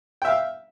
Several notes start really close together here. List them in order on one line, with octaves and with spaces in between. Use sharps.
G5 E5 F5